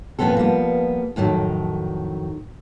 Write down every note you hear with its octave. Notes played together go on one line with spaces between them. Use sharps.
E2 A#2 F3 B3 C4 A4
F3 G3 A#3 B3
F2 A2 D#3 F#3